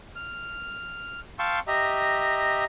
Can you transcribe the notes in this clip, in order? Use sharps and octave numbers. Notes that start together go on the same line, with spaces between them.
F6
F5 G5 A5 C6 C#6 E6
G4 D#5 E5 A#5